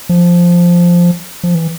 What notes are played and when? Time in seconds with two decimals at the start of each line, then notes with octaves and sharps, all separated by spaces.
0.09 F3
1.44 F3
1.55 E3